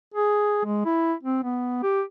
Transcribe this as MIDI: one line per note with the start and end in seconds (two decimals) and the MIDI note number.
0.14 0.61 68
0.65 0.84 56
0.85 1.14 64
1.23 1.42 60
1.44 1.82 59
1.83 2.03 67